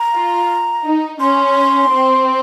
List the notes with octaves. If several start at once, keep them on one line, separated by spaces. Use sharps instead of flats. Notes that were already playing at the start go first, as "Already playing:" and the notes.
Already playing: A#5
F4
D#4
C#4 C6
C4